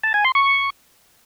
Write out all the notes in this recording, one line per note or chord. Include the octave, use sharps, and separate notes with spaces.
A5
G#5
C6
C#6